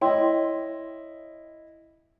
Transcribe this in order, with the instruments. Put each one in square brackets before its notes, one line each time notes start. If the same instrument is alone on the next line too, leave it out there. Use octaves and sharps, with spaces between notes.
[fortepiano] E4 D#5 [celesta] C#5 G5 C6